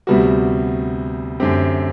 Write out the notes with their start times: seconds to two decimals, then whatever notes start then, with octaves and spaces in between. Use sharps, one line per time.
0.07 D2 C3 G3 B3 F#4
1.40 F#2 D3 A3 C4 G4